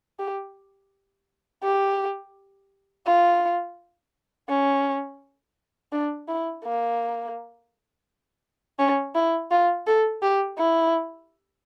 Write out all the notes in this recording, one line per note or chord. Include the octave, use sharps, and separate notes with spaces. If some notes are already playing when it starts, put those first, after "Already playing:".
G4
G4
F4
C#4
D4
E4
A#3
C#4
E4
F4
A4
G4
E4